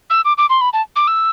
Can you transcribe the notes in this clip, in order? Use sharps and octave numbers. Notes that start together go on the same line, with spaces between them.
E6
D6
D6
C6
B5
A5
D6
E6